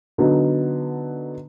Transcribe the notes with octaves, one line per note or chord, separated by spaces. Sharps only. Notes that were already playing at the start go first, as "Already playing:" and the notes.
D3 F#3 B3 D#4